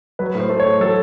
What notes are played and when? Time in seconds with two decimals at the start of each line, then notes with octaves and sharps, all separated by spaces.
0.19 F#3 B4
0.35 A2 C5
0.50 A3
0.60 C#5
0.65 A2
0.80 F#3 A4